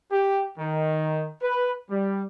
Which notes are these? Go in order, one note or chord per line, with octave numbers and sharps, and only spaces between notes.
G4
D#3
B4
G3